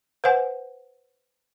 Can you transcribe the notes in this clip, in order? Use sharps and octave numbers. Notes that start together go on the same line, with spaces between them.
B4 C5 F#5 G#5